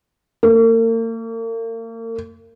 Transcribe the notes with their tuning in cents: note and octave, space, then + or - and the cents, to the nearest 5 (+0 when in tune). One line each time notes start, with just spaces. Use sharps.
A#3 -40